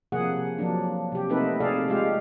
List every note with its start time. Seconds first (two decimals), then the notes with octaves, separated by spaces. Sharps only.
0.12 C3 F3 A#3 G#4 F#5
0.58 F3 F#3 A#3 D4
1.12 C3 G4
1.29 A3 A#3 C4 D#4 A4 B4
1.60 C3 G#4 A4 D5 F5
1.88 G#3 F4 G4 F5